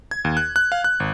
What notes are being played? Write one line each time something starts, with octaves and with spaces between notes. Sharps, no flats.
G#6
D#2
F#6
F#6
F5
F#6
G#1